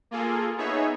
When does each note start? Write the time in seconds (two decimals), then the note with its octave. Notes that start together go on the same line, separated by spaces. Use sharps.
0.11 A#3 F4 G#4 A4
0.57 B3 D#4 G#4 C#5 E5